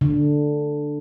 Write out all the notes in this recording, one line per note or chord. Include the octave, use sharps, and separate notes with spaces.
D3